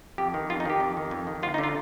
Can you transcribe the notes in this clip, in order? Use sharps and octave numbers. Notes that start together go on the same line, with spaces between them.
F2 G4
D#3
F2 F4
D#4
D#3 G4
F2
D#3
F2
D#3
D2 F4
D#4
D3
F4